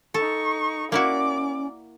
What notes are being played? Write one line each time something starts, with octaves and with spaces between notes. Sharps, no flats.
D#4 A4 C#6
A#3 C#4 E4 F#4 D5 D6